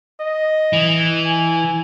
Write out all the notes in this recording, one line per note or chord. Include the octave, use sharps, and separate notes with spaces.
D#5
E3
G#5